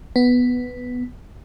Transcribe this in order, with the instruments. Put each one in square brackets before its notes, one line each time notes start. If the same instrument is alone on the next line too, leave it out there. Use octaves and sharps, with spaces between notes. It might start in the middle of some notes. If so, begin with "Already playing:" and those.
[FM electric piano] B3